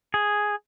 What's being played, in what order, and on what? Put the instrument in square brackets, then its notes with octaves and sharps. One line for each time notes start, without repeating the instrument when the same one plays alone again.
[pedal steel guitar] G#4